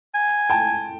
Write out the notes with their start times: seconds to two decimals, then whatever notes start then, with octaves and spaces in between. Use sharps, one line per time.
0.14 G#5
0.50 G5 A5